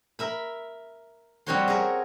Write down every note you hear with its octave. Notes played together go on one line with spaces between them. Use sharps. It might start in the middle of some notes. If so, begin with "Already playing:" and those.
A#4 E5 B5
G3 C4 F#4 C#5 F#5 C6
G#4 A#4